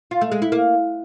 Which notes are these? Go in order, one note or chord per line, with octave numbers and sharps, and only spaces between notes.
F4
A3
G#3
E4
A#3